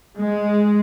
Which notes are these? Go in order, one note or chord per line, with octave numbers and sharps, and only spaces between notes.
G#3